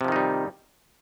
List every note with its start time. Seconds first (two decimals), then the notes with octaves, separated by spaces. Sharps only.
0.01 C3
0.04 F3
0.08 D#3
0.12 D#4
0.16 G3